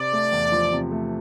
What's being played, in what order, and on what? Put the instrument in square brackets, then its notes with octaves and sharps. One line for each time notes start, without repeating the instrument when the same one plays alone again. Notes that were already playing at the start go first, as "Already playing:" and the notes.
Already playing: [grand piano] C3 C4 [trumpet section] D5
[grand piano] A3
E2
F3
C3
A3